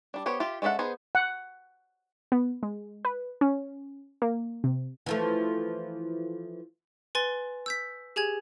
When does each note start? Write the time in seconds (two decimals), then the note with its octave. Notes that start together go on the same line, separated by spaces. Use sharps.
0.14 G3 D4
0.26 B3 G4 C5 C#5
0.40 F4 G4 E5
0.62 G#3 C#4 A4 E5 F#5
0.79 B3 D#4 G#4 B4 C5
1.15 F#5
2.32 B3
2.63 G#3
3.05 B4
3.41 C#4
4.22 A#3
4.64 C3
5.06 E3 F3 A3
7.15 B4 G#5 C6 A6 G7
7.66 E6 G6 B6
8.16 G4 G#4 G#5 G#6